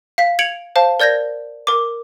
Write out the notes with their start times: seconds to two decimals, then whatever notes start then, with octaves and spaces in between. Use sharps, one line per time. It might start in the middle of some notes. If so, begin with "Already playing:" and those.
0.18 F5 B6
0.39 G#6 C#7 D7 F7 F#7
0.76 C5 F5 A5
1.00 A#4 D5 G6 G#6 A#6
1.67 A#4 D6